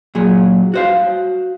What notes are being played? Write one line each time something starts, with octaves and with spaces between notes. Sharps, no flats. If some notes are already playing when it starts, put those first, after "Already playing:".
A#2 F#3 G#4
F#4 C5 F5